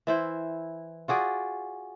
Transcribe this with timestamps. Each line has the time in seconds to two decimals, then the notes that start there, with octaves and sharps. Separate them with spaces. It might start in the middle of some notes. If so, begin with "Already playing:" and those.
0.07 E3 E4 C5
1.08 F4 F#4 G#4 D5